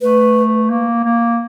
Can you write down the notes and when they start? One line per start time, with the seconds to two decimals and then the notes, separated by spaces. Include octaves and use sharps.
0.01 A3 B4
0.70 A#3
1.04 A#3